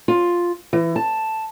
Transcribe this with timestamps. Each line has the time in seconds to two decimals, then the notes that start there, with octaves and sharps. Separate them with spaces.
0.08 F4
0.73 E3
0.96 A5